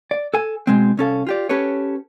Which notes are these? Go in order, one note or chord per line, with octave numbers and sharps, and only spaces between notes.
D5
A4 G#5
B2 G#3 C4
C2 C#4 A4 F5
F4 G4 D5
C#4 G4 A4 B4 C#5